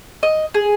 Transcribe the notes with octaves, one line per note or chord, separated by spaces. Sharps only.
D#5
G#4